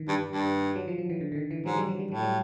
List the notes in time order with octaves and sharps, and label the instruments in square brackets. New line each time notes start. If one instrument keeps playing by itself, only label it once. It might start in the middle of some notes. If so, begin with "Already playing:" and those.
Already playing: [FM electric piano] D#3 E3
[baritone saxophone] G2
G2
[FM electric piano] F#3
F3
F3
E3
D3
D3
D#3
E3
[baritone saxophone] G#2 [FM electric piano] F#3
[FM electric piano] G3
F#3
G3
[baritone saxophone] A2 [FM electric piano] F#3
[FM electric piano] G3